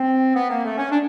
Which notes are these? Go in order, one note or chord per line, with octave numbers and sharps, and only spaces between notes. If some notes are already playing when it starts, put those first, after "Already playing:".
Already playing: C4
B3
A#3
A3
C#4
D4